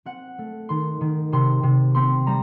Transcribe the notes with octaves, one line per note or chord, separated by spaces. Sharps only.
C4 F#5
A3
D#3 C6
D#3
C3 C6
C3
C4 C6
G3 A#5